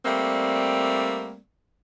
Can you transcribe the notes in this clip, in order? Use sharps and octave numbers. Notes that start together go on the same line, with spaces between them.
G3 A3 A#3 C4 D5